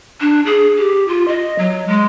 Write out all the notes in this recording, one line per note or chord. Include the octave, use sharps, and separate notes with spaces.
D4
G#4
G4
F4
D#5
F#3
G#3